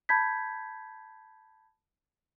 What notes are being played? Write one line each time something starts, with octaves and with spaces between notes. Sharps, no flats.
A5 B5 G6 G#6 B6